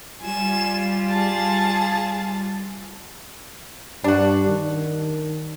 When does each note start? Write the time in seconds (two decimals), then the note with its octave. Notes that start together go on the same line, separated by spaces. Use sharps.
0.22 G3 F4 G#5 E7
1.10 G#4 A5
4.04 G2 D4 F#4
4.46 D#3